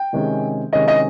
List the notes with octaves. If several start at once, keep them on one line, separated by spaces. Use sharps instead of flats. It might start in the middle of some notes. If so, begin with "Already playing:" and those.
Already playing: G5
C3 D#3 G#3 C#4
C3 D#3 G#3 C#4 D#5
D#5